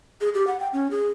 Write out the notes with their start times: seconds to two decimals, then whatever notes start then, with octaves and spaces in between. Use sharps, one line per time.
0.21 G#4
0.34 G4
0.47 F#5
0.60 G5
0.73 C#4
0.91 G#4